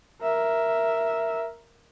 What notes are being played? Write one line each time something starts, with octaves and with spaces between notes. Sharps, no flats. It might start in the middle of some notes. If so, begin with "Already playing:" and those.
A#4 E5